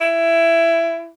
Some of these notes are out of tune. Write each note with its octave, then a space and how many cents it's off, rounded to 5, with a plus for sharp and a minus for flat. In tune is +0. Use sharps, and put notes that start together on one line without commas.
E4 +15